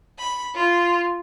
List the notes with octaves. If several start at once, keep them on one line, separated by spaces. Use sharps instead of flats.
B5
F4